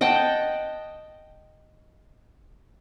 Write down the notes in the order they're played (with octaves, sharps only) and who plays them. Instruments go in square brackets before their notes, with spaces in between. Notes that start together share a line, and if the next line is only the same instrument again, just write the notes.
[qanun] D#5 F#5 G5 A5